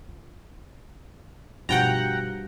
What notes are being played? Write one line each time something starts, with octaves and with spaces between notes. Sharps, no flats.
F4
G2 B2 F3 F#4 F#5 G5 A#5